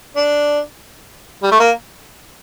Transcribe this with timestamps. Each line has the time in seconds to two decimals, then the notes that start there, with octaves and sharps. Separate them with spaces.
0.16 D4
1.42 G3
1.51 A3
1.60 A#3